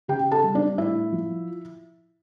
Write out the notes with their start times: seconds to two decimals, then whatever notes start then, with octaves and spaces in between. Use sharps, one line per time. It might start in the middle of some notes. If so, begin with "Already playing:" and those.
0.08 C#3 G4 G5
0.31 A4 A5
0.43 G3
0.55 D4 D5
0.78 A2 E4 E5
1.12 F3